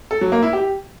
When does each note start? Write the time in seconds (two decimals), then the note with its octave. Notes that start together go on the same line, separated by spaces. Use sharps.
0.11 A4
0.21 F#3
0.32 A#3
0.43 E4
0.53 G4